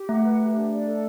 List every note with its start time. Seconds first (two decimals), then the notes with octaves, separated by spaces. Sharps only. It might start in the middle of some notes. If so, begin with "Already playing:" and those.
Already playing: G4
0.09 A3 F#5
0.25 B4
0.41 G4
0.56 D4
0.71 D5
0.86 A4